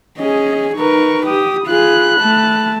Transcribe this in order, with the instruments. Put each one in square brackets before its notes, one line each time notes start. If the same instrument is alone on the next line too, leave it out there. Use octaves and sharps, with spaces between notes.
[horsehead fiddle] C#4 G#4 [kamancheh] D#5
[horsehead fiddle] D#4 A#4 [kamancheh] B4 C#6
[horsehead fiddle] G4 [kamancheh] D#6
[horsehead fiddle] F4 G#4 [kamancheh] B5 F#6
[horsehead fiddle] A3 A5